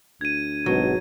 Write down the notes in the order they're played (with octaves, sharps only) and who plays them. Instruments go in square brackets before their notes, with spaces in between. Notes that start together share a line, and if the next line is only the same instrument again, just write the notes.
[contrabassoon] D2 [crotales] G#6 D#7
[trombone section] G#1 B2 [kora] F#3